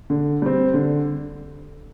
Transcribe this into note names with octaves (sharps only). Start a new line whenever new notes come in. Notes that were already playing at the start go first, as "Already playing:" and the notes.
D3
G3 C4
D3